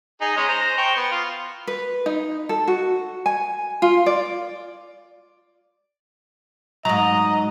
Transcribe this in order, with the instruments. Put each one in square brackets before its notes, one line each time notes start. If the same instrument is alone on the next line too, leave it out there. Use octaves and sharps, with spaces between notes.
[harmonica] D#4 G#4
G#3 C#4 D#5
C5 A#5
C5 G5 C#6
B3
F4
[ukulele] B4
D#4
A4
F#4
G#5
F4
D5
[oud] G#2 F#3 [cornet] D#5 [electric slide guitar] A#5